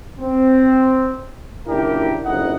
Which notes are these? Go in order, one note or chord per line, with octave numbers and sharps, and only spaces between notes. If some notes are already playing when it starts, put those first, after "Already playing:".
C4
F#1 A#2 D4 E4 G4 A#4
F#1 F2 D#4 E4 D#5 F#5